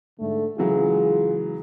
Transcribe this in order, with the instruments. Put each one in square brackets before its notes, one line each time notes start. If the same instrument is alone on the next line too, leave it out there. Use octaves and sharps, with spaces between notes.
[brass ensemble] G#2 D3 A3
[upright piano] C#3 E3 F#3 [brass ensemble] G#3 F4 G#4